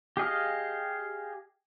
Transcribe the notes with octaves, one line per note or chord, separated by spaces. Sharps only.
G4 G#4 D#5 F5